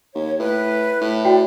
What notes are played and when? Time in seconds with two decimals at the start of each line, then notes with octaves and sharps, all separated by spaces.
0.15 D#2 C#5
0.39 A2 B4
1.01 A2
1.25 F#4 D5 G5